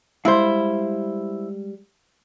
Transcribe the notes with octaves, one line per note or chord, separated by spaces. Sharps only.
G3 G#3 E4 C5 F5